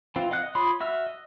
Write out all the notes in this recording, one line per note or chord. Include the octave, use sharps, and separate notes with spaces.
E3 C4 F4
D#5 F5 F#5 F#6
D#5
F4 C#5 B5 C6 D#6
F#4 E5 E6 F6
D#5